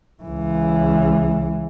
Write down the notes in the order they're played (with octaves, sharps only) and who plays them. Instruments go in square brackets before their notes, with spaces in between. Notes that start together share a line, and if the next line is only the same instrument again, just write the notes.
[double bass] C#2 E3